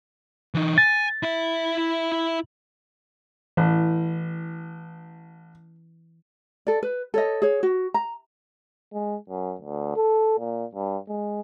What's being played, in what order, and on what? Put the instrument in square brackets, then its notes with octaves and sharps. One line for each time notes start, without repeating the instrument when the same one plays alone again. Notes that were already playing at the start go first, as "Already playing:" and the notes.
[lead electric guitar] E3 D#4
[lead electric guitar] G#5 [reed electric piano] A6
[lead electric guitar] E4 E5
[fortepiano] A1 [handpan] E3
[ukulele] A4 D5
B4
A4 C#5 D#5
G#4 C#5
F#4
A#5
[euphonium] G#3
F#2
D2
A4
A#2
G2
G#3